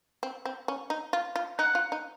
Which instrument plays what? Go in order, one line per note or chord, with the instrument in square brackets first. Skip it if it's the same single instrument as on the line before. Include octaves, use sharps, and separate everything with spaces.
[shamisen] C4
C4
C#4
D#4
F4
F4
[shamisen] D#4 [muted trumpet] F#5
[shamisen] F4
D#4